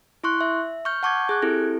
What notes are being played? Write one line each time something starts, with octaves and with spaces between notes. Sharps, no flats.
E4 C6 C#6 F#6
E5
C#6 F6 G6
F#5 A5 C#6 D6 G6 G#6
G#4 F#6 G#6
C4 E4 G4 A4